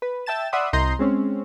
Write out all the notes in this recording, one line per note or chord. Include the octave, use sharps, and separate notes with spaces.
B4
E5 G5 A5 A6 E7
D5 E5 F#5 B5 C6 D#6
C2 D#5 A#5 C6 G6
G#3 C4 C#4